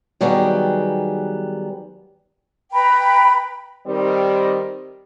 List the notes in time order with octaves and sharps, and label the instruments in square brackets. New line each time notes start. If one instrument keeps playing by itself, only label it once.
[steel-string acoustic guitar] D#3 F#3 G3 B3 G#4
[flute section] B4 G5 A#5 B5
[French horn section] D#3 G3 C4